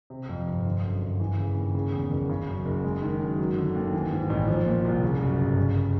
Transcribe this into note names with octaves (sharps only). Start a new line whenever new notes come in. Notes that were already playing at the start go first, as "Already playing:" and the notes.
C3
F2
G1
D3
F#2
G1
E3
C#3
D#2
C#3
E2
F#1
C#3
F#2
F#1
G#3
D#3
F#2
F#3
D3
D#2
E3
G#2
A1
F3
A#2
C2
C#3
F#2
G1
C#3